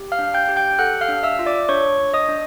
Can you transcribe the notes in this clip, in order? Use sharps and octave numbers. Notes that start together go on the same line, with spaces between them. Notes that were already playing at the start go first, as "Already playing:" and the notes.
Already playing: G4
F5 F6
D4
G5 G6
G4
G5 G6
A4 F#5 F#6
F5 F6
D4
E5 E6
F4
D5 D6
D4 C#5 C#6
D4
D#5 D#6
D4